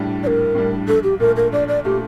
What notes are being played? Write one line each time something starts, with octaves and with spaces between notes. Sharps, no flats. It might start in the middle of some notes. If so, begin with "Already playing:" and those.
Already playing: A#1 A2 G3 D4
A#1 A#4 D5
A2 G3 D4
A#1 A4
G4
A#2 A3 A#4
A#4
A#1 D5
D5
A#2 A3 G4